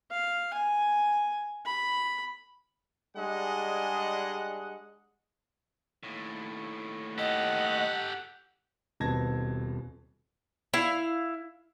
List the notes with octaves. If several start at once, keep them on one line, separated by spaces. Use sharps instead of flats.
F5
G#5
B5
G3 G#3 D4 G#4 D#5 F#5
D#2 A2
G4 A4 D#5 F#5
D#1 B2 C4 A5 G#6 A#6
E4 F5